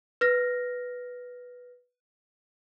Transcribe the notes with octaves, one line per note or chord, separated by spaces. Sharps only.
B4 F6 A#6